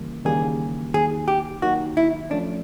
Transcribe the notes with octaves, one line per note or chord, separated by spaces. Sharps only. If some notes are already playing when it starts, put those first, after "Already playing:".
Already playing: D#2 C#3 E3 G3 A#3
D#2 C#3 E3 G3 A#3 G#4
D#2 D#3 F#3 G#4
G4
D#2 D#3 F#3 F#4
E4
F3 A3 C#4 D4